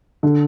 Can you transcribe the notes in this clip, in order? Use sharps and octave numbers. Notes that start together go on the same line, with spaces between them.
D3